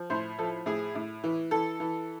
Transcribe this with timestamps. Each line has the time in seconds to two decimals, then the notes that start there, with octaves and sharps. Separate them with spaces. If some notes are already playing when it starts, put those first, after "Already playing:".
Already playing: F3
0.10 A2 C5
0.38 F3 A4
0.66 A2 G#4
0.95 A2
1.24 E3
1.51 E3 A4
1.80 E3